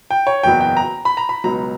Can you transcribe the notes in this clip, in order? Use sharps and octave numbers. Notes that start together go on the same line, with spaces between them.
G5
C#5
F#1 E2 B2 F#3 B3 G5
G5
A#5
B5
A#5
B5
C#2 B2 F#3 A#5